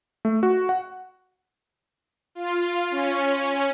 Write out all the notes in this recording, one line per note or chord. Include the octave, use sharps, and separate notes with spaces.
A3
F#4
F#5
F4
C#4